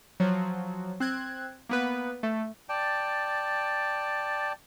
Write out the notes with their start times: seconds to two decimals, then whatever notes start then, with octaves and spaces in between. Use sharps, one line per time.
0.20 F3 F#3
1.00 C4 F#6 G#6
1.69 A#3 B3 B4
2.23 A3
2.69 D5 G5 A5